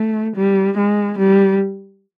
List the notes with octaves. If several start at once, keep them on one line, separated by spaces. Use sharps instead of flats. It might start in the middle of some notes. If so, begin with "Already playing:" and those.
Already playing: A3
G3
G#3
G3